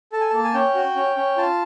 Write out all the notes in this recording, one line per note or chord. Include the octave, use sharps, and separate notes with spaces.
A4 A5
G#5
A#3 A5
G#5
C#4 G5
F#4
C#4
C#4
F4 A5